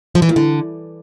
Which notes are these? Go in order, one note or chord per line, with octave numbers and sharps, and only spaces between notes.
F3
E3
A#2
D3